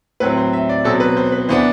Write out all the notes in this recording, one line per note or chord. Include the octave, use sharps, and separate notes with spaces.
A2 F#3 C4 B4
C5
E5
D5
B2 F#3 C4 A4
B4
C5
B4
E3 B3 D4 C5